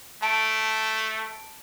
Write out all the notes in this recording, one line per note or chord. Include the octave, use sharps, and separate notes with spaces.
A3 A5 D7